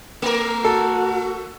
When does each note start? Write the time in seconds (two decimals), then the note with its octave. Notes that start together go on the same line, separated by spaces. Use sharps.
0.22 A3 A#4
0.65 F#4 A4